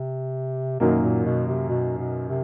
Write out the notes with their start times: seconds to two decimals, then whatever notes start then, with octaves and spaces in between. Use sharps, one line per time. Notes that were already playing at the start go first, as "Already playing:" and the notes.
Already playing: C3
0.80 F#2 B2 D#3 F#3 A#3
1.02 A#2
1.25 B2
1.47 C3
1.69 B2
1.99 B2
2.29 C3